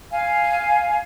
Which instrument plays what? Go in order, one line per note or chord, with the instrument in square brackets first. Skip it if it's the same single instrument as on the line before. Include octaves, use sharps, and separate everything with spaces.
[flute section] F5 G#5